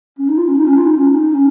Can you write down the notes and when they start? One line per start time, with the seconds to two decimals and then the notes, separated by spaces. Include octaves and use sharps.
0.19 C#4
0.28 D#4
0.38 F4
0.48 C#4
0.57 D#4
0.66 C#4
0.77 F4
0.86 D#4
0.97 C#4
1.15 D#4
1.35 C#4